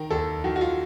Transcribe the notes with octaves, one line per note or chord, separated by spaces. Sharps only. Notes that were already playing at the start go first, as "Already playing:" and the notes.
Already playing: D#3 A#4
D#2 A4
D#3 F#4
F#4
F4